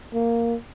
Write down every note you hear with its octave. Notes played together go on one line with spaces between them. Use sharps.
A#3